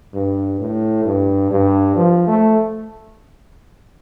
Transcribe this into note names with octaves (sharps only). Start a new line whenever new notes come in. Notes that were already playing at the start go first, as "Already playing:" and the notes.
G2
A2
G2
G2
F3
A3